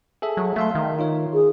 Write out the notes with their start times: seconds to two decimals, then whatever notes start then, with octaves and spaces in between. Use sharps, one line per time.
0.22 G#4 A4 E5
0.37 F#3
0.56 A3 E5 F5 C6
0.75 D#3
0.99 D#4 F4 C#5
1.34 G#4